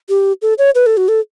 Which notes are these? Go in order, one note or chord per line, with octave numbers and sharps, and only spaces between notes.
G4
A4
C#5
B4
A4
F#4
A4